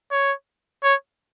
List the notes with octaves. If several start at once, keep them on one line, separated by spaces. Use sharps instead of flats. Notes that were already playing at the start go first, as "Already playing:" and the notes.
C#5
C#5